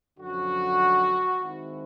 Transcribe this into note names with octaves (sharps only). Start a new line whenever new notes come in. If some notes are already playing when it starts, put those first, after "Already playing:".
F#2 D3 F3 F#4
D#3 G#3 C4 E4